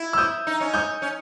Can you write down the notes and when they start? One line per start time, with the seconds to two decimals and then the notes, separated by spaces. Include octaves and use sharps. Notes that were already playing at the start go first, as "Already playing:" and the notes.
Already playing: E4
0.13 E6
0.18 D#6 G6
0.47 D#4
0.61 C#4
0.74 D#6 G6
1.02 C#4